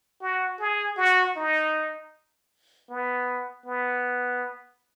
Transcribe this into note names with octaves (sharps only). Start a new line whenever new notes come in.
F#4
G#4
F#4
D#4
B3
B3